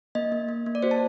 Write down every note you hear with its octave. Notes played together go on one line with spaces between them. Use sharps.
A#3 D#5
A#3
A#3
A#3
D5
F#4 C5
A5